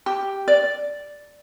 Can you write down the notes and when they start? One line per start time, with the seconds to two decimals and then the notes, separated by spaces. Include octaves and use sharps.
0.06 G4
0.48 D5